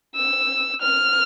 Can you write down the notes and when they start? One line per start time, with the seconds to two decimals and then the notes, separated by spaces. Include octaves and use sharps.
0.15 E6
0.81 F6